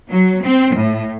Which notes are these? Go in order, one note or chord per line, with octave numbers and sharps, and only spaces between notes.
F#3
C4
A2